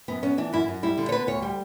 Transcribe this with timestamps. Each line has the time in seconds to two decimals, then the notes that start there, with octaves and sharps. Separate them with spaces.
0.08 F#2 B3
0.23 B3 C#4
0.38 E3 D4
0.53 F#2 E4
0.68 F#2
0.83 G3 E4
0.98 D3
1.09 C#5
1.12 B3 B4
1.27 D2 C#5
1.42 G3